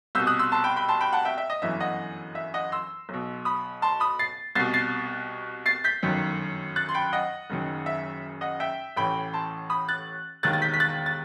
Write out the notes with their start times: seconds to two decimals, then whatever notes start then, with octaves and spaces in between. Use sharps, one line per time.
0.15 C2 B2 E6 G6
0.27 D#6 F#6
0.39 C6 E6
0.52 A5 C6
0.64 G5 B5
0.76 G5 B5
0.88 A5 C6
1.00 G5 B5
1.12 F#5 A5
1.25 E5 G5
1.38 E5
1.50 D#5
1.62 G1 F#2 E3 E5
1.80 D#5 F#5
2.35 E5
2.54 D#5 F#5
2.72 C6 E6
3.09 B1 B2
3.45 B5 D#6
3.82 A5 C6
4.00 B5 D#6
4.19 A6 C7
4.55 C2 B2 A6 C7
4.74 A6 C7
5.66 A6 C7
5.84 G6 B6
6.03 G1 F#2 D#3
6.76 F#6 A6
6.89 C6
6.94 G5 B5
7.13 D#5 F#5
7.50 F#1 F#2 D#3
7.86 E5
8.41 D#5 F#5
8.60 E5 G5
8.96 A1 A2 E3 G5 B5
9.33 A5 C6
9.70 B5 D#6
9.89 F#6 A6
10.43 E1 D#2 D#3 F#6 A6
10.53 A6
10.62 G6 B6
10.74 B6
10.80 F#6 A6
11.06 A6